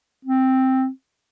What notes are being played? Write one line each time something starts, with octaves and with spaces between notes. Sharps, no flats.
C4